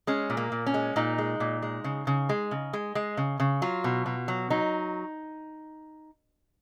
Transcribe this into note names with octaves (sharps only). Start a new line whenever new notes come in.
G#3 C#4
A#2
A#3
A#2
C#4
G#3
A#2 D#4
G#3
A#2
G#3
C#3
C#3
G#3
C#3
G#3
G#3
C#3
C#3
F#3 F4
B2
B2
F#3
F#3 D#4